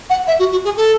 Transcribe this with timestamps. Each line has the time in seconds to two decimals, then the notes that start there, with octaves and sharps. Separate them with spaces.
0.10 F#5
0.27 E5
0.39 F#4
0.51 F#4
0.65 G#4
0.77 A4